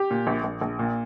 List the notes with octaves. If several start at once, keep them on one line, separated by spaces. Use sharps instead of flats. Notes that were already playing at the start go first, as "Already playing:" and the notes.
Already playing: G4
A#2
A#1
A#1
A#1
A#2